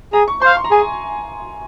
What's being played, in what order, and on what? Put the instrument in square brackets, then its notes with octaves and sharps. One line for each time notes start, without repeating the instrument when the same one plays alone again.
[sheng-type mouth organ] G#4 [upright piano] A#5
[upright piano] C#6
[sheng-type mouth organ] C5 [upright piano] C6
[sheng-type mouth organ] F5
[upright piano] C6
A#5
[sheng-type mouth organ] G#4 [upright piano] G#5